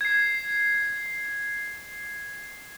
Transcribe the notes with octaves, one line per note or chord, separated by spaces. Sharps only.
G#6 C7